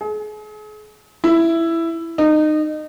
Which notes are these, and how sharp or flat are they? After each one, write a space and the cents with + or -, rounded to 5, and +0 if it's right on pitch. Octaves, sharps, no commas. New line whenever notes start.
G#4 +40
E4 +10
D#4 -25